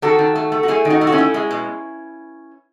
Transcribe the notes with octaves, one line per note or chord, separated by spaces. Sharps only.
D#3 F#4 A4
D#3
A3
A3
F#4
A3 E4 G#4
D#3
D#4 F#4
A3
F#4
C#4 E4
A3
G#3
B2